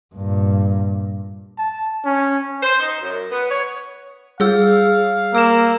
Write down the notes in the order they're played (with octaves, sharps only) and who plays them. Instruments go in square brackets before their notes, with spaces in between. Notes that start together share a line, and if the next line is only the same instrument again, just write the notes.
[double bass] G2 A#2
[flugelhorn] A5
C#4
[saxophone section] C5
D#4
F#2
B3
C#5
[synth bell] G3 G#4 E6 [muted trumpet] F5
[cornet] A#3 [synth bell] E6 E7